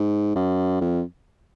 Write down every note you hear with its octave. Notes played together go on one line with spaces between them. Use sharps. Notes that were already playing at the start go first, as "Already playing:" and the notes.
Already playing: G#2
F#2
F2